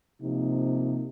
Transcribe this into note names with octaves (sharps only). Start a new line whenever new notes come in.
C3 F3 A#3 D#4